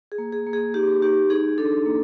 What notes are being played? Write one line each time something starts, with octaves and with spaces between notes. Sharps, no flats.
G#4
A#3
G#4
A#3
G#4
D#4 G4
D#4 G4
D#4 G#4
D4 A4
A#3